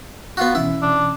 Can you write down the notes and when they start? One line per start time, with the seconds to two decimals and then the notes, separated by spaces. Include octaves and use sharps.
0.37 B3 F4 F#4
0.55 B2 E3 C#4 E4
0.83 D4